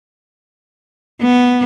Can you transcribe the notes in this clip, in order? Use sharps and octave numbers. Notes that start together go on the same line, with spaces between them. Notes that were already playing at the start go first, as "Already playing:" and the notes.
B3